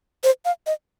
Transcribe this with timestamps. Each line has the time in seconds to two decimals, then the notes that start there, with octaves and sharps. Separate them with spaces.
0.24 C5
0.45 F5
0.67 D#5